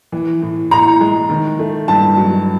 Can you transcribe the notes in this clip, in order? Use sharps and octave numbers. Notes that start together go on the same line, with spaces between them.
E3
A2
A2 A#5
G#3
D#3
A3
G2 A5
F#3